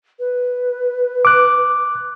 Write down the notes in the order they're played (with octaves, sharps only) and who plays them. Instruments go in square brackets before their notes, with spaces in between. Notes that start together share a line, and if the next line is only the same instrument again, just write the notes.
[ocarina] B4
[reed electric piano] D6 F#6